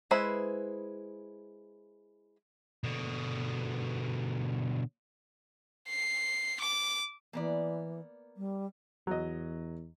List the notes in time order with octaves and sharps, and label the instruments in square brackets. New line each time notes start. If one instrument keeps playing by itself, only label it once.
[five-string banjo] G#3 E4 B4 C5 B5
[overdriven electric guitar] B2 D3
[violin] C7
D6
[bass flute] E3 [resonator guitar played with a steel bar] A#3 B3 D5
[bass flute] G3
[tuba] E2 [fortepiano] F#3 D#5